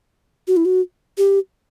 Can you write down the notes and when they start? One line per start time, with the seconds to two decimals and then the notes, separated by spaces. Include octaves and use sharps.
0.48 F#4
0.57 E4
0.65 F#4
1.18 G4